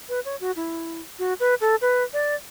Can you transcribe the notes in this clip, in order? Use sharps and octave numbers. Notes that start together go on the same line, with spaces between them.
B4
C#5
F#4
E4
F#4
B4
A4
B4
D5